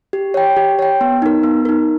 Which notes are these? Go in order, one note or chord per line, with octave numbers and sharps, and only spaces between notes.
G4
C#5 G5
G4
C#5 G5
B3
D#4 A#4
B3
D#4 A#4